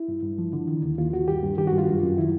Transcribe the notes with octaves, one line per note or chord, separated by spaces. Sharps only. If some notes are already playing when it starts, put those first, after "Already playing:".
Already playing: E4
G2
G2
F3
D3
D#3
D#2
D#2 F4
D#2 F#4
G2 G4
G2
D#3 G4
F#4
G2
F4
F#2
F#2
D#3 E4